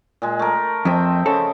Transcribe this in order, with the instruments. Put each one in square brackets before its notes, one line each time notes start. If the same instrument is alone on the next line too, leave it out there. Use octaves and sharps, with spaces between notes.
[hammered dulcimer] A#2 G#3
A3 A#4
[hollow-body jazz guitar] F2 [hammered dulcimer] C4 D#5 E5
[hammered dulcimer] C#3 [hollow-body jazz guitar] A4